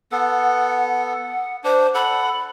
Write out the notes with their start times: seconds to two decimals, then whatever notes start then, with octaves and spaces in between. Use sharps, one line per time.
0.12 B3 A4 F#5
1.64 D4 C5
1.95 A4 F#5 B5